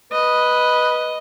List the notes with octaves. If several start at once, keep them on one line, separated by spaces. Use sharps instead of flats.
B4 D#5